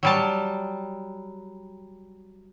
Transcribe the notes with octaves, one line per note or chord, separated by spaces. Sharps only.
F#3 G3 A5